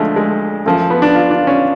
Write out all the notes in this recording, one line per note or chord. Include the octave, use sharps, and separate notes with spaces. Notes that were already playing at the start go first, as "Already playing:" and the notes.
Already playing: D2 D3 F3 G#3 A3
G#3
F#2 F3 A3
B3
D4
F4
D4
C#4